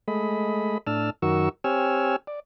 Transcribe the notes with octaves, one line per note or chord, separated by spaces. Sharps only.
G#3 A3 D#5 B5
A2 D4 A5 E6 F6
F#2 D#3 F#4 A#4 C#6 E6
C4 G4 C#5 G#5 E6 F6
D5